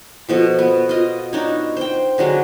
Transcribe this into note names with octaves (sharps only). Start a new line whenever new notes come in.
B2 F3 A4
B3
F4 D#5
D4 D#4 C#5
C5 G5
D3 F#3 G#3 D4